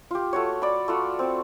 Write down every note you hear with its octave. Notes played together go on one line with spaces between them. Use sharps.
F4 G4
A3 F#4 C#5
D5 B5
A3 F4 F#4
C4